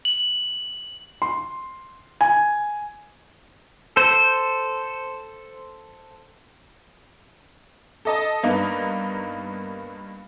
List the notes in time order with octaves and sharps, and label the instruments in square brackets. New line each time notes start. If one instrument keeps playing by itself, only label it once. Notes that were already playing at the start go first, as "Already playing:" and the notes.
[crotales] F#7
[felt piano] C6
G#5
[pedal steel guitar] A4 C5
[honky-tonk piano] A4 D#5 A5
G2 A#3 B3 D#4